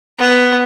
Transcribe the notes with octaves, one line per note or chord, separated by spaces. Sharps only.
B3